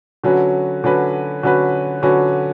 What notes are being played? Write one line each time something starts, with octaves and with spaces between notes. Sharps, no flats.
D3 F#3 C#4 F#4 B4
D3 F#3 C#4 F#4 B4
D3 F#3 C#4 F#4 B4
D3 F#3 C#4 F#4 B4